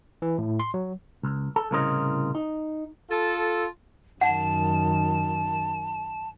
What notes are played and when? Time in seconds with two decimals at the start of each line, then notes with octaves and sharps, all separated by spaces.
0.22 E3
0.38 A2
0.60 C6
0.74 F#3
1.23 C#2
1.56 A4
1.71 C2 A2 C#3 A#4 C5 D#5
2.35 D#4
3.10 F4 A4
4.21 F#2 D#3 F#5 A5